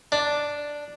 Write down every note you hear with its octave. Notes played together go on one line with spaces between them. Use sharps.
D4